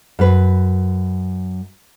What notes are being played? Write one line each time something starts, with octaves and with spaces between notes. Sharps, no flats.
F#2 B4